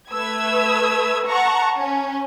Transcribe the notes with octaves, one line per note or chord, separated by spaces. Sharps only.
A3 B4 E6 G#6
F#5 A5 A#5 C#6
C#4